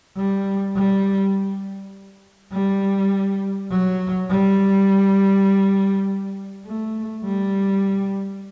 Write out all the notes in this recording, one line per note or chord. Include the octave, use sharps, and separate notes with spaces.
G3
G3
G3
F#3
G3
A3
G3